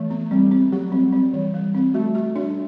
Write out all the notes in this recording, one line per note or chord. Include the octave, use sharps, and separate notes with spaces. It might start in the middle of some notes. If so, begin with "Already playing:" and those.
Already playing: E3 A3
B3
G3 C4
C4
F#3 G4
C4
G3 C4
E3
G3
C4
A3 F#4
F#4
D4